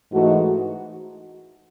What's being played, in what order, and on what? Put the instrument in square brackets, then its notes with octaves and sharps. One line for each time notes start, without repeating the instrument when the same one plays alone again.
[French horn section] G#2 E3 A3 D#4 F#4